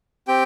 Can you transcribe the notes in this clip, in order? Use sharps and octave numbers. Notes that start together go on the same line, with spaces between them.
C4 G4 G5